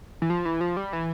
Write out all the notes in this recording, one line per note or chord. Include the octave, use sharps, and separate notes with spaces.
E3
F3
E3
F3
G3
E3